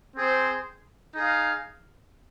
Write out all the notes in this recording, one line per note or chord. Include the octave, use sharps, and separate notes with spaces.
C4 G#4 C5
D#4 G#4 F5